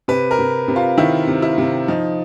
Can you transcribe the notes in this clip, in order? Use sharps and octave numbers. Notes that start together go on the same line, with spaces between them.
C3 B4
A#4
C3
C3
F4
D#3 E4
C3
E4
C3
F3 D#4